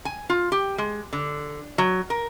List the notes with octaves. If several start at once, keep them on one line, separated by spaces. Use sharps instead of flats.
G#5
F4
G4
G#3
D3
F#3
A#4